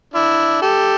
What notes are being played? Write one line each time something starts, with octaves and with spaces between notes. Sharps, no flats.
D4 E4
G4 A4